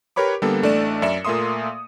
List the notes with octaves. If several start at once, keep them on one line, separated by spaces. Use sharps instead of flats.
G4 A#4 B4 C#5 B5 D6
D3 G3 A#3 B3 A4
A1 A3 D4 D5 E7
F#2 D5 E5 C#7 E7
A#2 A3 A#3 E5 C6 D#6